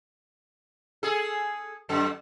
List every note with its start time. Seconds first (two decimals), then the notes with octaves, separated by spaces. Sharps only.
1.03 G#4 A4
1.89 F#2 A4